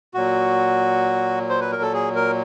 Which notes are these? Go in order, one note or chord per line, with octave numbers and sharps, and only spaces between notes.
A#2 F#3 F#4
C5
B4
A#4
A4
G#4
A#4